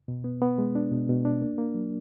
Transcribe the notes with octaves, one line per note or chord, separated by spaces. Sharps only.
B2
B3
B3
G#3
D4
B2
B2
D4
A#3
A#3
F#3